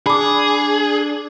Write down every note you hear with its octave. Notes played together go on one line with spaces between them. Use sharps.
D4 G#4 B5 D6